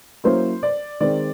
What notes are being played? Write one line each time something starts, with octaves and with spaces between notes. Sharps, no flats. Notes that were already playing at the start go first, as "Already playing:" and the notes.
F#3 A#3 C#4 E4 C5
D5
D#3 G#3 C4 D#4 D5